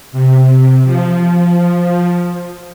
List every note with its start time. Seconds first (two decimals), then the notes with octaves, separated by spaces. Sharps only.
0.12 C3
0.84 F3